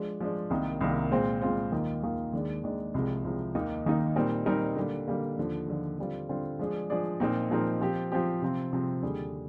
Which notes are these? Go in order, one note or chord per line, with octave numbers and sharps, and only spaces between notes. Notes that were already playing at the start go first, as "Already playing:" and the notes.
Already playing: F3 G#3 D4
F3 G#3 D4
C2 C3 D#3 A#3
C2 C3 D#3 A#3
A#2 G#3 C4 F4 C5
A#2 G#3 C4 F4 C5
D#2 D#3 A#3 F4
D#2 D#3 A#3 F4
D#2 D#3 G#3 D4
D#2 D#3 G#3 D4
C2 C3 F3 G#3
C2 C3 F3 G#3
D#2 D#3 A#3 D#4
D#2 D#3 A#3 D#4
A#2 G3 C4 D#4 A#4
A#2 G3 C4 D#4 A#4
D3 G3 A#3
D3 G3 A#3
D#2 D3 F3
D#2 D3 F3
D3 G3 C4 F4
D3 G3 C4 F4
F3 G#3 D4 G#4 D5
F3 G#3 D4 G#4 D5
A#2 F3 C4 D#4 A#4
A#2 F3 C4 D#4 A#4
F3 C4 G4
F3 C4 G4
C3 F3 C4
C3 F3 C4
D#2 D3 G3 D4 G#4